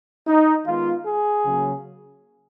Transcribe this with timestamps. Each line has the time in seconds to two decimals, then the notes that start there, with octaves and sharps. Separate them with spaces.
0.27 D#4
0.66 D#3 G#3 B3 F4
1.05 G#4
1.44 C#3 F#3 A#3